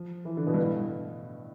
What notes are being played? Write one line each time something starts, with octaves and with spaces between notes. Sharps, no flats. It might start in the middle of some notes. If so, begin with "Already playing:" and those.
Already playing: F3
E3
D3
B2
G2
A2